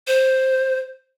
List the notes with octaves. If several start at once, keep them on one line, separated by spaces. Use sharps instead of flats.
C5